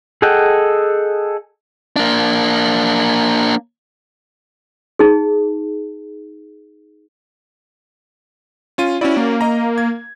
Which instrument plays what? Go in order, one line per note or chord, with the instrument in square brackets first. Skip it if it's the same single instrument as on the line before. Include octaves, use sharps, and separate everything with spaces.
[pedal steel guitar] G#4 A4 D#5 F#5 G5
[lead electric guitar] A#3 D4
[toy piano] D#4 G#4
[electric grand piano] C#4 F4 D#7
[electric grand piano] C#4 F#4 D5 [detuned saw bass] E4
[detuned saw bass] A#3
[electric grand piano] D#5 A#5
G#6